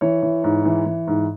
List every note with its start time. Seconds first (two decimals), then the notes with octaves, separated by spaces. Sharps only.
0.01 E3 C#5
0.22 E3
0.44 G#2
0.65 E3
0.86 E3
1.07 G#2